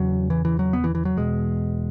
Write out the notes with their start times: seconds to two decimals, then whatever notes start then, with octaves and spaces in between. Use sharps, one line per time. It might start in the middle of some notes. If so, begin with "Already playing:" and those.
Already playing: E2 C#3 F#3
0.30 E3
0.45 E3
0.59 F#3
0.73 B3
0.84 E3
0.95 E3
1.05 F#3
1.17 E2 B2 G#3